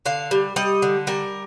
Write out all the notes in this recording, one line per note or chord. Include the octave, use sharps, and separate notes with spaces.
D3 F5
G3
G3 D#5
D3
G3 A#4